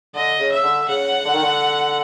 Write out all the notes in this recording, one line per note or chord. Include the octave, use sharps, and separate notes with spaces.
D3 D#5
C#3
E5
D3
C#3 F#5
D3
D#3
D3